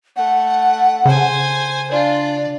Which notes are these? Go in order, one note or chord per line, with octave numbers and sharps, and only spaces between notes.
A3 F#5
C#3 C5 G#5
D4 F4 D5